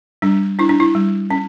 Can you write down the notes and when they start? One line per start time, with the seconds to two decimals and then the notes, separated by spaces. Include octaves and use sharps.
0.22 G3 D4
0.59 D4 E4
0.69 D4
0.80 E4
0.95 G3
1.30 C#4